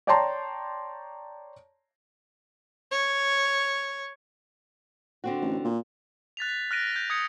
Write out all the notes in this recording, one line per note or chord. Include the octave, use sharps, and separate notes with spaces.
C#5 D5 G5 A5 A#5 C6
C#5
D3 C4 F#4
A1
A#2
F#6 A6 B6 F7
B6
F6 F#6 A#6 D7 D#7
F#6 G6
D#6 G#6 C#7